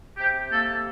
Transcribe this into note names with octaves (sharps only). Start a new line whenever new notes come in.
C3 G4
A#3 A4